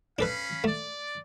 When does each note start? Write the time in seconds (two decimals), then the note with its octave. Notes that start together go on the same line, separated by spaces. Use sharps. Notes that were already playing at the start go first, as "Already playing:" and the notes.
0.19 C#4 D4 A4 B4 F5 B5
0.64 A3 D5